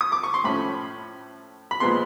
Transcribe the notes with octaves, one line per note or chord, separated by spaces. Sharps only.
D#6
D6
C#6
C6
A2 F3 A3 C#4 B5
B5
A#2 F3 G#3 B3 C6